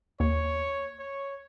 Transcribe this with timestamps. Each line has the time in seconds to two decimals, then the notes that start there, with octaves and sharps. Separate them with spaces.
0.20 D#2 C#5
0.99 C#5